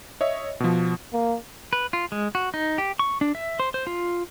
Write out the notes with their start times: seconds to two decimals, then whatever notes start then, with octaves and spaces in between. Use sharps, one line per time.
0.21 C#5 D#5 E5
0.60 B2 F3
1.13 A#3
1.73 B4
1.93 F4
2.12 G#3
2.35 F#4
2.54 D#4
2.78 G4
2.99 C#6
3.21 D4
3.35 E5
3.60 C5
3.74 C5
3.87 F4